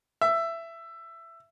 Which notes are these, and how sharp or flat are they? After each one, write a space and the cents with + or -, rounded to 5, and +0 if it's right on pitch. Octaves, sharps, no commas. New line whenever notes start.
E5 +15